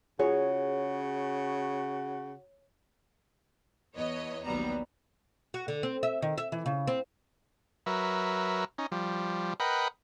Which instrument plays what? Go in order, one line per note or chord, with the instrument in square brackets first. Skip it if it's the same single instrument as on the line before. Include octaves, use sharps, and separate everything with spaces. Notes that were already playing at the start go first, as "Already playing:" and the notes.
[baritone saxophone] C#3 [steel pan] F4 G#4 [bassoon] F#4 [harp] C#5
[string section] E2 B3 C#5 D#5
A#1 D#2 F#3 G3 B3 A#5
[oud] F#4
D3
C4
E5
D#3
E5
E3
C#3
C4
[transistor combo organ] F#3 A#4 B4 E5
C#4 D#4
F3 G3
A#4 B4 D#5 F#5 G5 B5